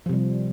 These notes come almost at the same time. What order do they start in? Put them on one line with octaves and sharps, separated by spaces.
F3 C3 G3